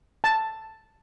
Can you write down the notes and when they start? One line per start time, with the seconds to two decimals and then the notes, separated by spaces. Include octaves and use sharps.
0.24 A5